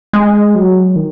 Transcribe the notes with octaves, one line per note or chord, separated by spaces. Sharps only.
G#3
F#3
D#3